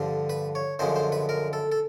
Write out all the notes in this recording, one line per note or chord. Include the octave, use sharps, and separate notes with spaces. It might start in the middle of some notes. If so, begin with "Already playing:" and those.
Already playing: G2 D3 F3
B4
C#5
F#2 D3 F3 G#3 C5
C5
B4
A#4
A4
A4